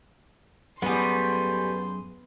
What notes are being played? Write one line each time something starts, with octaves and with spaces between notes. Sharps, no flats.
F#2 A2 G3 B3 G#4 C6